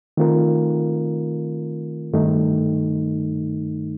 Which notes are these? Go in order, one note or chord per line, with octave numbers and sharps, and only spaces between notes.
D#3 A3 C4 F4 A#4
G2 D#3 A3 D#4